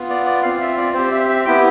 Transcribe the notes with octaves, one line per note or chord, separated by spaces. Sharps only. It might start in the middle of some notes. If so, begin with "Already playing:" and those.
Already playing: B3 F4
D5
D5
C4 F4 F5
E5
D5
C4 G4 C5
E5
E5
B3 E4 G4 G5